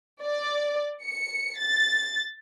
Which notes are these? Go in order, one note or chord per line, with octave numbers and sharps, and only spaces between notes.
D5
C#7
A6